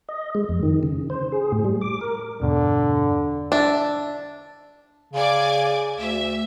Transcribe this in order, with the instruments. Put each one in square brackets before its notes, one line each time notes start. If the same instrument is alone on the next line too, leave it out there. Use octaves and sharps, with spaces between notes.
[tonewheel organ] D#5
G#3
F2
D#3
C#3
C5
G#4
A2
G3
D6
A#4
[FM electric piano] E2 G2 B2 [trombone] D3
[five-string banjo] D4 E5
[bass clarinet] C#3 [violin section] D5 G#5 D6
[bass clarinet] D2 [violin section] E5